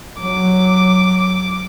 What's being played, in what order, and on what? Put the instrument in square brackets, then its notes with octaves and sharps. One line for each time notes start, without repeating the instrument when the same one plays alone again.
[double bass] F#3 [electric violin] D6